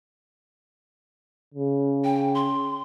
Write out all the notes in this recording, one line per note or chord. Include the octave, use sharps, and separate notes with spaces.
C#3
G5
C6